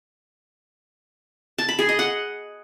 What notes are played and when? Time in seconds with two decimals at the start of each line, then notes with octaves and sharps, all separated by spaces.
1.58 A5
1.69 B5
1.79 G#4
1.89 D#5
1.99 F#5